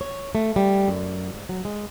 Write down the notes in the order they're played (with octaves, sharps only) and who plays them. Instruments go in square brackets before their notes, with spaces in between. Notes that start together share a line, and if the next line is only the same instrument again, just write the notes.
[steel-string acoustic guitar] C#5
A3
G3
F#2
G#2
F#3
G#3